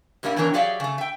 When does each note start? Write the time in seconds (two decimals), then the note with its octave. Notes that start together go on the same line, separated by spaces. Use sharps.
0.23 A2 G3 A#3 D#4 E4
0.36 B2 E3 C4 D4 A#4 C#5
0.53 F#3 G4 G#4 D5 E5 F5
0.80 C#3 A3
0.98 E5 G5